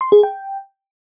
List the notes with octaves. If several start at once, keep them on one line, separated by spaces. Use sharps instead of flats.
C6
G#4
G5